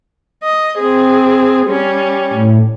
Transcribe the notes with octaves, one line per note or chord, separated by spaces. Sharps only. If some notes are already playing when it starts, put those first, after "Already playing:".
D#5
C4 G#4
G3 C#4
A2